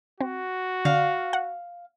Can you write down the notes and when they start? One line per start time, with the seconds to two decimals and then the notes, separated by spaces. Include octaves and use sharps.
0.20 C4 F#4
0.85 D3 F5
1.33 F#5